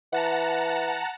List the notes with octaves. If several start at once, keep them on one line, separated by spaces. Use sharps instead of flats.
E3 F#5 A5 A#5